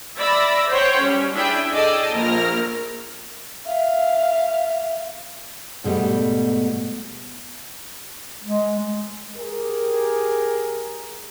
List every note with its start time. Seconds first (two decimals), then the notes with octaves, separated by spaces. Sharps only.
0.19 D5 E5 B5 E6 A#6
0.71 C5 C#5 F#5 G5
1.02 G3 C#4
1.34 D4 E4 G#4 E5 G5
1.71 G#4 A4 D5 D#5 G5 A5
2.15 A#1 A#3 A#4 F6 A#6
3.66 E5 F5
5.84 G#2 B2 G3 A3
8.43 G#3
9.37 G4 G#4 A#4